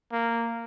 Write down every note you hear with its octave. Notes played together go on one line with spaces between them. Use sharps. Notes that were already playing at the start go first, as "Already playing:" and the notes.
A#3